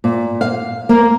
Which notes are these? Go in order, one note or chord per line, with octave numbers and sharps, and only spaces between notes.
A#2
F5
A#3